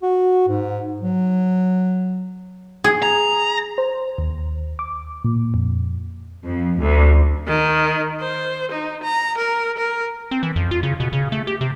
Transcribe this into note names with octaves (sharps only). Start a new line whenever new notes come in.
F#4
G#2
F#3
G#4
A#5
C5
D#2
D6
A#2
F2
F2
D2
D#3
C5
D#4
A#5
A#4
A#4
C4
E3
F2
F4
C#3
B2
C#3
A3
G4
C3